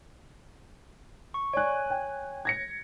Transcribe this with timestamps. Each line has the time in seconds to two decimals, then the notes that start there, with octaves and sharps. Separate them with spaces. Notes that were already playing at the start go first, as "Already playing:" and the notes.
1.34 C#6
1.53 C#5 D5 G#5 F#6
1.90 G5
2.45 G#6 A#6 C#7